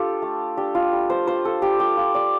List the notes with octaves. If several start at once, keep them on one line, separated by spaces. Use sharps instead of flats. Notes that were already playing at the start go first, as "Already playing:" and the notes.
Already playing: D4 F4 G4 A4
A3
D4 G4
F4
G3
C5
F4 C5
A4
G3 G4
G4
F4
D5